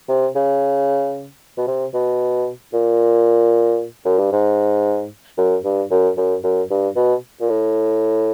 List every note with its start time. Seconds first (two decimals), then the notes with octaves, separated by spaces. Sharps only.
0.09 C3
0.35 C#3
1.58 B2
1.67 C3
1.94 B2
2.73 A#2
4.05 F#2
4.18 G2
4.32 G#2
5.38 F#2
5.64 G2
5.91 F#2
6.17 F#2
6.44 F#2
6.70 G2
6.96 B2
7.41 A#2
7.49 A2